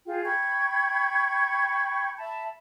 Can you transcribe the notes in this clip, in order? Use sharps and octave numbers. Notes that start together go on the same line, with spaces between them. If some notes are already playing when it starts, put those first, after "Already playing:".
F4 G#4 G5
G5 B5 C#6 G#6
E5 A5 B5